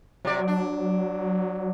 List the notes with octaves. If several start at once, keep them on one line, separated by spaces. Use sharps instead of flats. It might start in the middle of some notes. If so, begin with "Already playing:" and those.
C3 F#3 D5
D4